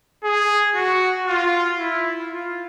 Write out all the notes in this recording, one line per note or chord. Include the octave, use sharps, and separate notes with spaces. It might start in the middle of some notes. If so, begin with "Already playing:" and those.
G#4
F#4
F4
E4
F4